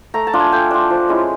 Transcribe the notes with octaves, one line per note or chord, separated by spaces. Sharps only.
A3 A#5
A5
D4 F4
G#5
A3 G5
D4 F4
F3
G#3 C#4 E4